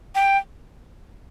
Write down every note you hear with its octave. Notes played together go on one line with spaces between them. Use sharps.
G5